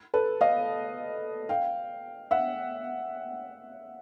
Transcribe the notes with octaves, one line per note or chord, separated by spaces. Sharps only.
A4 B4
D#5 F5
F5 G5
E5 F#5